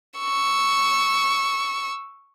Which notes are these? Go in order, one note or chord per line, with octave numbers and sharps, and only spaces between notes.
C#6 E6